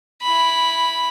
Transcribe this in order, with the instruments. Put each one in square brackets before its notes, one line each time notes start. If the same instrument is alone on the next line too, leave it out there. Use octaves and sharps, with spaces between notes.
[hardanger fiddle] E4 B5